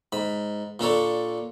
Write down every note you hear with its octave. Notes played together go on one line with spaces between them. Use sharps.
G#2 B5
A#2 D4 A4 C#5